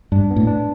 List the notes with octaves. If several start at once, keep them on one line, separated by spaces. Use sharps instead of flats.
G2 D4
B3
A2
D4